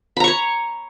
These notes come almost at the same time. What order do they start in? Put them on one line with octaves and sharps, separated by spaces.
B5 A#5 C#6 C#5